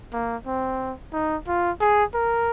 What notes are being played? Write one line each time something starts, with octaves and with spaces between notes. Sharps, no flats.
A#3
C4
D#4
F4
G#4
A#4